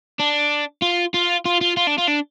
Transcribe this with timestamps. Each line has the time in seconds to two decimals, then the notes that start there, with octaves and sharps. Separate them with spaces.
0.19 D4
0.82 F4
1.14 F4
1.45 F4
1.61 F4
1.77 F4
1.87 D4
1.98 F4
2.08 D4